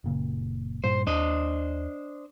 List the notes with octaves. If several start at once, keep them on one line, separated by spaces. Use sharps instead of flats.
F#1 A#2 C#3
G2 A#2 C5
D#2 D4 C5 D#5